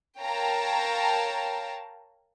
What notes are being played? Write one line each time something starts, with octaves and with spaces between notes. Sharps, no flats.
A#4 C#5 F5 G5 A5 A#5